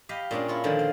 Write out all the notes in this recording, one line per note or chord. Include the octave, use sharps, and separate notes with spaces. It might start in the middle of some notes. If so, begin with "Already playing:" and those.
G4 D#5 F5 B5
A#2 C#4 D4 G#4
E4 F4 C#5
D3 D#3 F3
C5